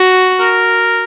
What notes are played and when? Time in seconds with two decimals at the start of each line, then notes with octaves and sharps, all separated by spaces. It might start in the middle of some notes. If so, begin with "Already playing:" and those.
Already playing: F#4
0.40 A#4